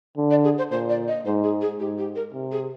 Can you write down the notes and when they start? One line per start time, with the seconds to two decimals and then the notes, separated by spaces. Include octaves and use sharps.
0.17 D3
0.31 D5
0.44 G#4
0.58 C5
0.71 A#2 C5
0.89 D5
1.08 D#5
1.25 G#2 C5
1.44 G#4
1.61 G#4
1.80 G#2 G4
1.98 G4
2.16 A#4
2.33 C3
2.52 G#4